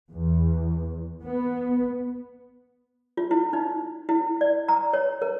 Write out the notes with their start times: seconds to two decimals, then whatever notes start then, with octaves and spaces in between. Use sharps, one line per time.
0.11 E2
1.24 B3
3.17 F4
3.31 E4
3.53 D#4
4.09 E4
4.41 D5
4.68 A#5
4.93 C#5
5.22 A#4